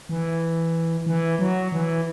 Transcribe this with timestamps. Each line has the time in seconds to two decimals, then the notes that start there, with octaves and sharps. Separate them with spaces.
0.09 E3
1.06 E3
1.39 F#3
1.72 E3